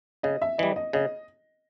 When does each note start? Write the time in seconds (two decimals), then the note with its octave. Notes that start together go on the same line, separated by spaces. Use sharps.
0.23 C#3 D#5
0.42 E5
0.58 E3 G3 D#5
0.76 D#5
0.93 C#3 D#5